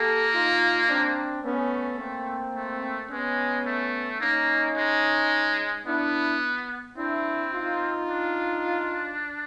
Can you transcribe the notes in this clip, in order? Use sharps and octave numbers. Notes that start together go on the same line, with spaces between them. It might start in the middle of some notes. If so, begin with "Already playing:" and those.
Already playing: A#3 G4 A4
D#4 F4
C4 D4
A3 B3 C#4
A#3 C4
A3
G#3 B3 C#4
A3
A#3 C#4 D#4
G#3
B3 D4 E4
C4 D4 E4
D#4 F4
D4